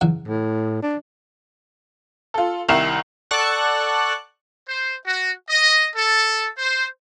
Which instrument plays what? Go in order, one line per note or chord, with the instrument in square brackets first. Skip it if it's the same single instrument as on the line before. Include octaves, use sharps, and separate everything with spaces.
[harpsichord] C#3 E3 F#3
[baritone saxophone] A2
D4
[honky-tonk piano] F4 A4
C2 D#3 E4 C7 E7
[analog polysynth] A4 D5 F#5 A5 C#6 F#6
[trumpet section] C5
F#4
D#5
A4
C5